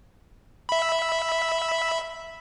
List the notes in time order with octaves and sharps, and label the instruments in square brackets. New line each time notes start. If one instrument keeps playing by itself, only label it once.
[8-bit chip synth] E5 B5